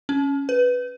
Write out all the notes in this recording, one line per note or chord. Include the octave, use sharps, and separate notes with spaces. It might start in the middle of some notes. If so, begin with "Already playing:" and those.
C#4
B4